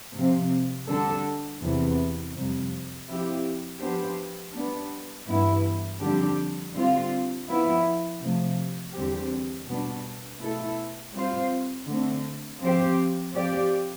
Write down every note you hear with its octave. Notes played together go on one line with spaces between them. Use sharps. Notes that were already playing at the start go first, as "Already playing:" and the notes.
C3 F3 C4
D3 G3 D4 A4
E2 C3 E3 B3
F2 C3 G3
F3 C4 E4 G4
F3 B3 D4 G4 C5
G3 B3 D4
G2 E3 B3 E4
F2 D3 G3 D4 G4
D3 G3 C4 F4
F3 B3 E4
C3 F3 A3
E2 D3 G3 C4 G4
B2 G3 B3 D4
B2 A3 E4 A4
G3 C4 F4 C5
D3 A3 C4
F3 C4 G4 C5
F3 C4 G4 D5